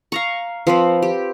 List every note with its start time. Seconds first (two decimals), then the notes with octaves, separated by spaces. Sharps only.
0.12 F5 A#5 C#6
0.67 F3 C4 B4
1.02 G4